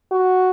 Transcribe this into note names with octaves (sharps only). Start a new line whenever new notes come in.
F#4